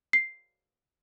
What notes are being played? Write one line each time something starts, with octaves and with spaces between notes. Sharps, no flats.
C7